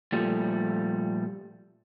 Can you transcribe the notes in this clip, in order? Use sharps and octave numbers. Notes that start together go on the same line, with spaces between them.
A#2 F3 G3 A3